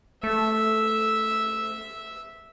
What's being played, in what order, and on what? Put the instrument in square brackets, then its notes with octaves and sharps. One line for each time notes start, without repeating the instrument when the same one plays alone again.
[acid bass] A3 [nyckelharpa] E5